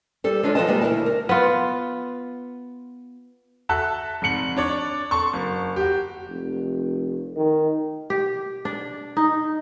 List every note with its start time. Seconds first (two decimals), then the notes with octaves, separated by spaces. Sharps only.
0.24 G3 A4
0.43 G#3 D4 F4 C#5
0.55 F3 G#3 A4 B4 D#5 A5
0.67 C3 G3 G#3 A#3
0.81 D2 A#2 E4 A#4 A5
1.06 A#4
1.29 B3 F4
3.69 F#4 A4 E5 A5 F#6
4.22 F1 G#2 C#7 F#7
4.57 D4 C#5 D5
5.11 A4 A5 C6 C#6
5.33 F#1
5.76 F#4 G4
6.29 F1
7.36 D#3
8.10 G4
8.65 D4
9.17 D#4